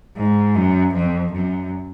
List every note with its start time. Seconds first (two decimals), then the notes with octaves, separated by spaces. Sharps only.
0.17 G#2
0.55 F#2
0.94 F2
1.33 F#2